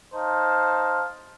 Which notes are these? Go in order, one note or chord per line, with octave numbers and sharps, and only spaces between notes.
D#4 C5 F5 A5